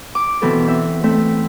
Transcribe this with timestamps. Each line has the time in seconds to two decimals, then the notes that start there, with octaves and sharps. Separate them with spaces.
0.15 D6
0.42 B2 E3 C4 E4 A4
0.67 C4 E5
1.03 A3 C4 A4 E5